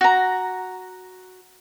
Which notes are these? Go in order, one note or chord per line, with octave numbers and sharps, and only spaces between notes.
F#4 A#5